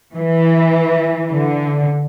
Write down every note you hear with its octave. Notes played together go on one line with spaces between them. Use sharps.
E3
D3